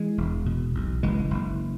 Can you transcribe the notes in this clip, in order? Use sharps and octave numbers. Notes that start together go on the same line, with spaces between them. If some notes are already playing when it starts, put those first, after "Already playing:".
Already playing: E3 G#3
E1
B2
B1
F#1 E3 G#3
F#1